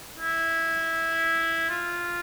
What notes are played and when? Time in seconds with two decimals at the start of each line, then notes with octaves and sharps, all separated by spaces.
0.18 E4
1.70 F4